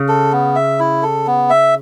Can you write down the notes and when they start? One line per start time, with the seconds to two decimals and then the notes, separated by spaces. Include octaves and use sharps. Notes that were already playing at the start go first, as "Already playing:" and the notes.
Already playing: C#3
0.08 A4
0.32 B3
0.56 E5
0.80 E4
1.03 A4
1.27 B3
1.50 E5